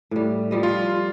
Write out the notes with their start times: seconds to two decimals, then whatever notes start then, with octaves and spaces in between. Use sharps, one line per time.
0.11 A2 G3
0.51 F3 G3 D#5
0.63 F4